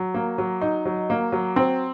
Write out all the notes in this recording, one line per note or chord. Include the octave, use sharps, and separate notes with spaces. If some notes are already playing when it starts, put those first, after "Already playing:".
Already playing: F#3
A#3
F#3
D#4
F#3
A#3
F#3
C4